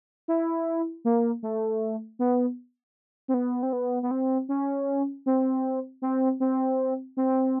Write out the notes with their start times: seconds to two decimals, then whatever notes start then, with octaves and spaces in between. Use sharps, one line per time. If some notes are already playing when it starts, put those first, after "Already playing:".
0.28 E4
1.05 A#3
1.43 A3
2.19 B3
3.28 C4
3.34 B3
3.63 C4
3.73 B3
4.03 B3
4.11 C4
4.49 C#4
5.26 C4
6.02 C4
6.40 C4
7.17 C4